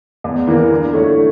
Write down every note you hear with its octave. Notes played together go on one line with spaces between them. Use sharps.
E2
E3 A#3
D3
A3 E4 A4 C#5